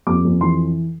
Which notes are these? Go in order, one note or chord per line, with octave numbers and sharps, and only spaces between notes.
F2 D6
F2
E3 C6